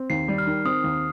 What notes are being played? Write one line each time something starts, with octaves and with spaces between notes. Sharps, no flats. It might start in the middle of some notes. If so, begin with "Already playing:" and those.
Already playing: C4
D#2 C7
G3
F6
D#3
C4 D#6
D#2